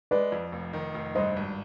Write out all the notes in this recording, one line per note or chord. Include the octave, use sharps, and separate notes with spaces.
G#3 B4 D5
F2
F1
D#3
F1
G2 C5 D#5
G#1